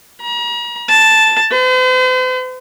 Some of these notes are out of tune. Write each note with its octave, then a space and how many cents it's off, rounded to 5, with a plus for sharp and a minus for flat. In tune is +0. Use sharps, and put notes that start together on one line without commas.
A#5 +40
A5 +0
C5 -45